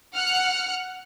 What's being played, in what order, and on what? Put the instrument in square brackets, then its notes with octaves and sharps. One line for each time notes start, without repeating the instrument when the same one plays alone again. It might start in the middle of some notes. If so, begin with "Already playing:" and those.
[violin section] F#5 F6 F#6 C#7